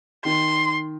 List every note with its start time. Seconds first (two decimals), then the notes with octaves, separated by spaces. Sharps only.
0.25 D#3 C6